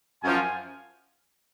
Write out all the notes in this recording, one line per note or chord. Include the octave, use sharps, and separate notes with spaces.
F#2 F3 G#5